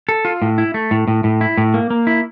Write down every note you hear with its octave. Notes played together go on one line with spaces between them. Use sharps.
A4
F4
A2
E4
A3
A2
A2
A2
E4
A2
A#3
A#3
E4